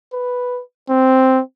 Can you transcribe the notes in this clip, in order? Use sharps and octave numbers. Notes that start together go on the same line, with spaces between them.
B4
C4